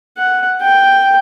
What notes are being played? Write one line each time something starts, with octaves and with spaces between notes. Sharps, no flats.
F#5
G5